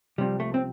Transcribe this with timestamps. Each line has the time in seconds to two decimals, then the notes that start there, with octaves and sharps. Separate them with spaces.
0.18 C2 C3 F3 G3
0.40 A3
0.54 C4